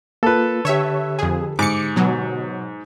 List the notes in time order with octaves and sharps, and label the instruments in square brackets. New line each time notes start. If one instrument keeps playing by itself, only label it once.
[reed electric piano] A#3 F4 [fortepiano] A4 B4
[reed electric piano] D3 G4 [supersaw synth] C#5 E5
[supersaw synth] F2 G#4
[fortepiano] G#2 [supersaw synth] D6 C#7
[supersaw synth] B2 F#3